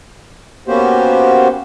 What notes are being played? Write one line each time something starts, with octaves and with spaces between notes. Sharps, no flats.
A#3 B3 C#4 F#4 G4 C5